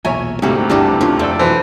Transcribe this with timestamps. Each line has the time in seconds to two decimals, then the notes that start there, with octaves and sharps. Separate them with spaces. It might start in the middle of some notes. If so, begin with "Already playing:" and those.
0.05 B1 E2 A#2 A#4 C#5 E5 G#5
0.42 D2 G#2 C3 G#3 A#3 F#4
0.69 F#1 C#2 G2 E3 A#3 D4
1.01 D#2 C#4 D4 F4 A#4
1.19 F2 A3 C4 D4 A4
1.39 E3 F#3 C5